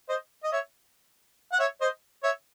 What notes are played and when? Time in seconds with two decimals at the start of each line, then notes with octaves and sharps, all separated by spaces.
0.09 C5 D#5
0.43 D#5
0.52 C#5 E5
1.52 F#5
1.59 C#5 E5
1.81 C5 D#5
2.24 C#5 E5